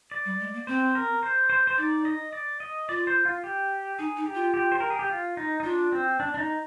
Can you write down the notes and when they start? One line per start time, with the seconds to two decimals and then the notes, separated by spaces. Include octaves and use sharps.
0.11 D5
0.25 G3
0.40 G#3
0.54 A#3
0.67 C4 C5
0.95 A#4
1.23 C5
1.50 C5
1.67 C5
1.78 D#4 D5
2.05 D#5
2.33 D5
2.60 D#5
2.89 F4 D5
3.07 C5
3.25 F4
3.44 G4
3.99 D#4 G#4
4.17 D#4
4.26 G4
4.35 F4
4.54 G4
4.72 C5
4.80 A#4
4.90 G#4
4.99 G4
5.10 F4
5.37 D#4
5.60 D#4
5.64 D4 F4
5.92 C4
6.20 D4
6.34 D4
6.38 D#4